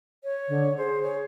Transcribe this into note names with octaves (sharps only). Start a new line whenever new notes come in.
C#5
D3
G#4 C5
C#5